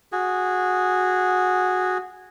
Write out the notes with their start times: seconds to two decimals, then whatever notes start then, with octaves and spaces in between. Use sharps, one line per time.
0.12 F#4 G#4